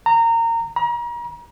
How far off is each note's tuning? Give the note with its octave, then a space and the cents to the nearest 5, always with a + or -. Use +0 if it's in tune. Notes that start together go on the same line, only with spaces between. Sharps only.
A#5 -25
A#5 +35